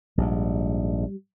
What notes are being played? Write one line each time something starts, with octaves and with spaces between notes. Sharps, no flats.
A#1 G#2 G3